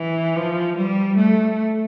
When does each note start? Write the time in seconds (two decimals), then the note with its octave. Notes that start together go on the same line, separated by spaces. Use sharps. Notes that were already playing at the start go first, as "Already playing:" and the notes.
Already playing: E3
0.35 F3
0.77 G3
1.17 A3